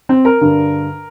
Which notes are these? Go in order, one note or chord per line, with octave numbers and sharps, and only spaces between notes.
C4
A#4
G2 D3